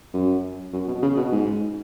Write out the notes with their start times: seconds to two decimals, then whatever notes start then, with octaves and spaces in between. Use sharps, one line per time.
0.14 F#2
0.73 F#2
0.87 B2
1.03 C#3
1.17 B2
1.32 G#2